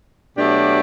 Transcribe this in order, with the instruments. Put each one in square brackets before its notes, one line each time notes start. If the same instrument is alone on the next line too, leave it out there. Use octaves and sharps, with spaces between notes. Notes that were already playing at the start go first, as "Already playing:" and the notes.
[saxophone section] B2 F#3 A3 D4 G4